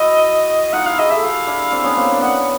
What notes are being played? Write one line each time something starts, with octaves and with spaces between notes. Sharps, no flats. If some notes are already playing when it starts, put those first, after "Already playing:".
Already playing: E4 F#4 D#5
D#4 F4 F#5
E4 F#4 F5
F#4 G#4 D#5
G4 A4 E5
G4 A4 F5
D4 E4
C4 D4
B3 C#4
A#3 C4
D4
B3 C#4 F#5